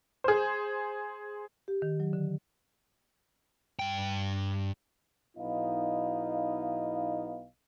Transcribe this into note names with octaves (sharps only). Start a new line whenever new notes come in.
G#4 C5
G4
D#3
F#3
D3
G2 G5
B1 B3 D#4 E4 D#5 F5